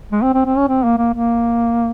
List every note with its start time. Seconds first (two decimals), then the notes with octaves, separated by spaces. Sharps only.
0.11 G#3
0.23 C4
0.34 C4
0.46 C4
0.57 C#4
0.69 C4
0.84 A#3
0.98 A#3
1.14 A#3